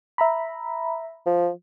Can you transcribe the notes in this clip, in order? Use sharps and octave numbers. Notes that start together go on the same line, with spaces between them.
E5 A#5 B5
F3